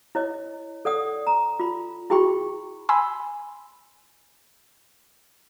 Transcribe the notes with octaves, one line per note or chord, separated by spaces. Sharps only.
E4 C#5 D#5
A4 D5 F#5 D#6
A#5
F4 B5
E4 F#4 G#4 G5 B5 C#6
G#5 B5 C6 E6